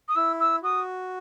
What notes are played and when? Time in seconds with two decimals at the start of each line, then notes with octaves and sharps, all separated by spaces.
0.08 D#6
0.15 E4 E6
0.39 E6
0.62 F#4 D#6